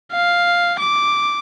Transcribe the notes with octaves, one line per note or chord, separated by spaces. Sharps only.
F5
D6